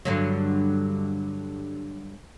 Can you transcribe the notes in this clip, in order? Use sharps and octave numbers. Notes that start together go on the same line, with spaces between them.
G2 D3 F#3